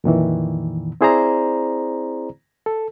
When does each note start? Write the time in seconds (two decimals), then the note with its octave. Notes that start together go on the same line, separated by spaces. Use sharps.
0.04 F2 A#2 D#3 E3
1.01 C4 E4 G#4 C5 D5 A#5
2.66 A4